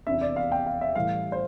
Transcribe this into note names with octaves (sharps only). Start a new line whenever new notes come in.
E2 C3 E3 B3 D4 E5
D5
F5
G5
F5
E5
A2 E3 G3 F5
C5